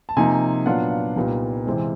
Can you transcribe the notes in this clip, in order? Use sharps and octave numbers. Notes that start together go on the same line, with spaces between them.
A5
C3 F3 A#3 D#4 G#5
A#2 F#3 B3 D4 F4 F#5
F5
C2 A#2 G3 B3 D#4
C3 E3 G#3 C4